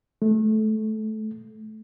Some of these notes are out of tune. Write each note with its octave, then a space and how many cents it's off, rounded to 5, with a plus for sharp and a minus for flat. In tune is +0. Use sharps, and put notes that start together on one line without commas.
A3 -20